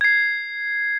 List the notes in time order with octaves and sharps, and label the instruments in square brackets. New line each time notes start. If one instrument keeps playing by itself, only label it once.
[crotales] G#6 C7